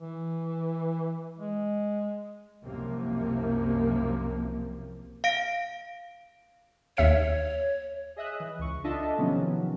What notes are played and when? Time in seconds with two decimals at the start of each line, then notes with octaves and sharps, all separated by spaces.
0.01 E3
1.38 G#3
2.65 C2 F#2 C3 F3 A#3
5.24 F5 A#6 D7
6.97 D#2 C#5 E5 C#7
8.16 G#4 D#5 E5 D#6 F#6
8.40 E3
8.59 C#2 C#6
8.84 D4 F4 A4 D#5 E5 A5
9.18 C3 D#3 F3 F#3 B3 C#4